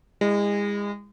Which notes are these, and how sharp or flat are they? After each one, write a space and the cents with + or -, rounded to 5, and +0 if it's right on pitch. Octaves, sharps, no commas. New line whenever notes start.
G#3 -30 E4 +0